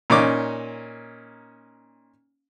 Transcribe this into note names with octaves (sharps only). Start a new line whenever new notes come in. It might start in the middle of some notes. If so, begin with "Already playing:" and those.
A#2 C#4 D#4 D6